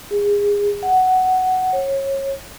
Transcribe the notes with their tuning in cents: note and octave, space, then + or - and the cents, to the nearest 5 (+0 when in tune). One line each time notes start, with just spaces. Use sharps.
G#4 -25
F#5 +10
C#5 -25